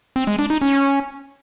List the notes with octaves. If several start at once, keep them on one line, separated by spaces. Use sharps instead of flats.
C4
G#3
D4
D#4
C#4